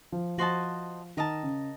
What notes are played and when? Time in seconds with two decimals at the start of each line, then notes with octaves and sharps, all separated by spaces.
0.12 F3
0.38 F3 F#4 C5 D#5 A5
1.17 D#3 A#4 D#5 A5
1.43 C#3